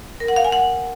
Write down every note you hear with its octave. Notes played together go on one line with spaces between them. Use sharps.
A#4
F#5
F5
G#5
F#5